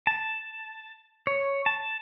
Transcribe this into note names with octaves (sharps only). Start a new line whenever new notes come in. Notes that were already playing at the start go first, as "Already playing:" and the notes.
A5
C#5
A5